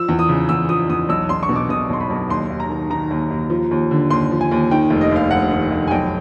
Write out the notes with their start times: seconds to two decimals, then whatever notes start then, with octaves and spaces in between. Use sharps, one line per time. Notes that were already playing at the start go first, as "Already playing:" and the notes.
Already playing: F3 E6
0.08 E2
0.19 D#6
0.29 C#3
0.49 E2 E6
0.69 F3 D#6
0.89 E2 D#6
1.09 B1 E6
1.29 B1 C6
1.43 C#6
1.49 B2
1.56 D6
1.69 B2 D#6
1.90 B1 C6
2.00 B5
2.10 B1
2.29 D#2 C6
2.50 D#2
2.60 A#5
2.70 D#3
2.90 D#3 A#5
3.11 D#2
3.30 D#2
3.50 F3
3.71 D#2
3.91 D3
4.10 D#2 C6
4.31 F3
4.41 G#5
4.51 D#2
4.71 D#3 G5
4.90 F1
5.01 D#5
5.11 D#2 F5
5.31 F1 F#5
5.51 D#3
5.72 F1
5.87 G#5
5.91 B1 G5